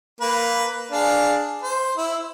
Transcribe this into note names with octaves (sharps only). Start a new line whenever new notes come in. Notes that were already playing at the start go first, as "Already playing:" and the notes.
A#3 B4
D4 G#4 F5
C5
E4